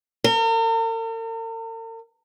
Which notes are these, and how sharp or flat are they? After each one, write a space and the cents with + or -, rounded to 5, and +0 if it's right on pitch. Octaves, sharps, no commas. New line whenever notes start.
A#4 -45